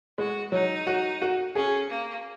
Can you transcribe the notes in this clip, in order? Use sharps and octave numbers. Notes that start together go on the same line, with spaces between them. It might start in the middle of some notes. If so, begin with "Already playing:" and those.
G#3 F#4
F#3 D#4
F#4
F#4
C#4 G#4
A#3